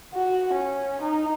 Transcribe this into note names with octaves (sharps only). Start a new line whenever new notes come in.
F#4
C#4
D#4